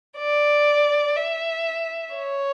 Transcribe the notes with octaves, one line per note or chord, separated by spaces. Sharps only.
D5
E5
C#5